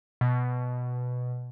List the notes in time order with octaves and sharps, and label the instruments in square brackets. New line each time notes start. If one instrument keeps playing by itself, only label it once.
[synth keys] B2